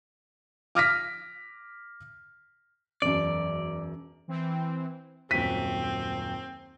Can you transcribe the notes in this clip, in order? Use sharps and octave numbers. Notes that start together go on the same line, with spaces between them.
D6 F6 A#6 B6
E1 F#2 D5
E3 C4
D#1 F#2 C4 B6 D#7